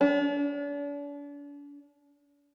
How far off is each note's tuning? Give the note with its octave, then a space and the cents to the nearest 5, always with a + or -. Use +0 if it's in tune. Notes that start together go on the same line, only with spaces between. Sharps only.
D4 -40